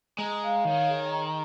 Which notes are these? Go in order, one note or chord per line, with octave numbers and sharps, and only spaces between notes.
G#3 A#5
F5
D#3 C#5
G#4
A#5